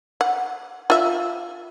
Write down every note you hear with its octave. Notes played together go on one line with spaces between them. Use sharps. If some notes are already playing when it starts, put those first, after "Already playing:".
F#5
F4 E5